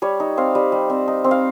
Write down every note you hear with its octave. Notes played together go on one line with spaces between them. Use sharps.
G3 C#5
D#4
C4 F5
G3
G3
C4
D#4
C4
F5